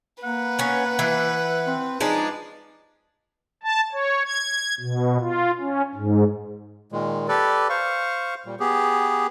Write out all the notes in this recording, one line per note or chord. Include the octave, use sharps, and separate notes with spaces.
A#3 B4 F#5
B3 C#4
E3
C4
F3 G#3 D4 D#4
A5
C#5
G#6
B2
F4
C#4
G#2
A#2 D#3 G#3
G4 A4 B4 D5
C5 F5 C#6
A#2 G3
B3 G4 G#4